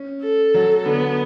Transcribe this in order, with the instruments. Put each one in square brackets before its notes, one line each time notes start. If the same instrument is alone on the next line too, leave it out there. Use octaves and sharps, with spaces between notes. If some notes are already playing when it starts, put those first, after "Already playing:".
Already playing: [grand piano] C#4
[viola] A4
[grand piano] F#3
[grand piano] D3 [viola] B3